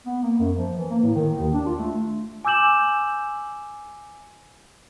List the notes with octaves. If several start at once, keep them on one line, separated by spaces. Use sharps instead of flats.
B3
A#3
F#2
F3
E3
A#3
A2
D#3
D#2
D4
F4
A3
G#5 D6 E6 G6 E7 F#7